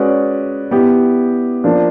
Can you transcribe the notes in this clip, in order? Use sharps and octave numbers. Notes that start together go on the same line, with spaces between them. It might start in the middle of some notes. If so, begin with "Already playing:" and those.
Already playing: G#3 C#4 F#4 B4 D5
B3 E4 G4
F3 A#3 D4